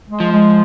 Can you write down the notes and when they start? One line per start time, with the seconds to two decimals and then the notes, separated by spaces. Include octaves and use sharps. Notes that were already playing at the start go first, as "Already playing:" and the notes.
0.09 G#3
0.20 F3
0.32 G#3